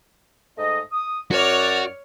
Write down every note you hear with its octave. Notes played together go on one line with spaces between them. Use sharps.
G#2 A3 D#5
D#6
F#2 F#4 C#5 D5 F6